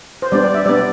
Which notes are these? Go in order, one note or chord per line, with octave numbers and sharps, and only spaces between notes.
C5
G3 B3 D4 D5
D5
E5
G3 B3 D4 D5